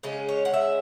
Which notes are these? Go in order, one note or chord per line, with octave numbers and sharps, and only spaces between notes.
C#3 G#3 C#4
C#5
F#5
E5